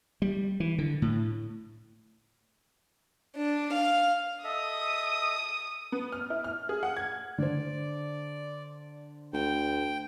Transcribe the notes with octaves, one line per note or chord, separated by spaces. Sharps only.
G3
E3
D3
A2
D4
F5
A4 D#5 E5 D#6
B3
F6
E4
F6
G#4
F#5
G#6
D3 C5 D5
D2 G5